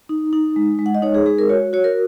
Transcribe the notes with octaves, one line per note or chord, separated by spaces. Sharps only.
D#4
D#4
G#3
G#3
F#5
D#5
D#4 C#5
G#4
G#3 G#4
A#4
F#4 C#5
F#4 C#5
A#4